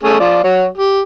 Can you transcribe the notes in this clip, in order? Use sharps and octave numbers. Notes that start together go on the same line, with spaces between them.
A3 C#4 G#4
F3 F4 D5
F#3 F#4 C#5
G4